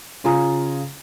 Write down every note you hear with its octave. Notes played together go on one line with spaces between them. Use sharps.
C#3 F4 G#5 A#5 D#6